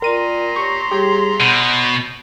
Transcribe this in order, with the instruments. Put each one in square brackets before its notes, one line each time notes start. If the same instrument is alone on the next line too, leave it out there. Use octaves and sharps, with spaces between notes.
[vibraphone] F4 D5 G5 [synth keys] A#4 D#7 [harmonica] A#5 C6
[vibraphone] G4 C#5 [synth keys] C#6
[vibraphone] G3 G#4 C#5 [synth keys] G4
[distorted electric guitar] B2 [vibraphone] C#5 [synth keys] G6